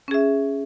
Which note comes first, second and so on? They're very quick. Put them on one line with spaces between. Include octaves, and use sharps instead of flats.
C#4 G#4 E5